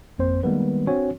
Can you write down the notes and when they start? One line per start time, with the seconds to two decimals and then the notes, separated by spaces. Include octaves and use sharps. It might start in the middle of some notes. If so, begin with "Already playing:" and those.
0.18 G#1 F2 A#3 C4 C5
0.43 D#3 G3 G#3 A#3 B3 B4
0.87 C4 D4 F#4 C#5 G#5